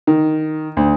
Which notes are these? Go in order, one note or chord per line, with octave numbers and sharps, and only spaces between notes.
D#3
D2